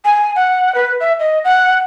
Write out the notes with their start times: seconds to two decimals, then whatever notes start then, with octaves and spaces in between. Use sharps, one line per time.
0.05 G#5
0.36 F#5
0.75 B4
1.00 E5
1.19 D#5
1.44 F#5